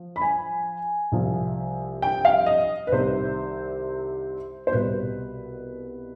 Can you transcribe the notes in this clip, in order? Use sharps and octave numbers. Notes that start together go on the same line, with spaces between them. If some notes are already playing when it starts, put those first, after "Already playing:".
Already playing: F3
B5
G#5
C2 C3 F3
G5
F5
D#5
B4
C2 C3 D#3 G3 C5
C5
C2 B2 G3 B4